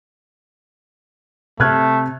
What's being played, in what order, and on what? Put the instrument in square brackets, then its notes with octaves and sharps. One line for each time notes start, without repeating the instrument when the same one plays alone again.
[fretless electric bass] C3 [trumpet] A3 [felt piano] F6 F#6 G#6